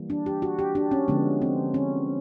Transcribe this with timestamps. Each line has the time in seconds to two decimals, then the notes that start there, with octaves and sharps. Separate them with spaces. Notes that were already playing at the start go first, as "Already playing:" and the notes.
Already playing: E3 G3 A#3
0.10 D4
0.26 G4
0.42 F#4
0.59 G4
0.75 D4
0.91 C#4
1.08 D3 F3 G#3 B3
1.42 C4
1.74 C#4